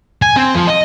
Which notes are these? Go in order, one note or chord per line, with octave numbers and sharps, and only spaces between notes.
G#5
C4
F3
D#5